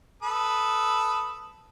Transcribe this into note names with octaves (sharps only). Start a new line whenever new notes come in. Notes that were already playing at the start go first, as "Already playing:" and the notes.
A4 B4 D#6